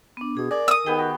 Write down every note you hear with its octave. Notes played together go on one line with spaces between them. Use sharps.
B3 D4
B2 G#4 D#6
A#4 D5 G#5
D#6 E6
D#3 B3 G4 G#4 G5
F#4